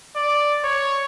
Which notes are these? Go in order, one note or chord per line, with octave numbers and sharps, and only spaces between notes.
D5
C#5